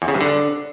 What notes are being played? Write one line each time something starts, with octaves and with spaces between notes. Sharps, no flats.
E2
C#3
G2
D3